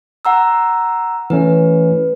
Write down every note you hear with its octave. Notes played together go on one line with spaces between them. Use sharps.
F#5 A#5 E6
E3 A3 C#4 B4